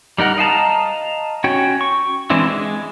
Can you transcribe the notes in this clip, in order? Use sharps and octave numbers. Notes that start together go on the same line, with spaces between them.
G3 D#4 A#4 F#5
D#5 F5 A5 A#5
C#4 F#4 C#5 G5
C#6
E3 G#3 C4 D4 E4
G#3